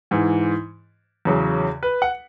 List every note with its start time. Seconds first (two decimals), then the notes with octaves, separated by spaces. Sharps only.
0.11 G#2 E3
1.25 E2 C#3 F#3
1.83 B4
2.02 F#5